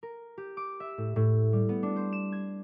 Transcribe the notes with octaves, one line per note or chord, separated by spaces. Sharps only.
A#4
G4
D6
E5
A2
A2
G3
B3
D4
C5
E7
G#6